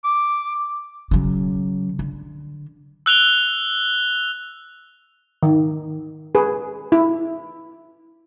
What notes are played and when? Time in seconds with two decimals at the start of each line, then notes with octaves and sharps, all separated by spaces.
0.04 D6
1.11 C#3 F#3
1.99 D3
3.06 E6 F#6 F7 G7
5.43 D#3
6.35 G#4 B4
6.92 E4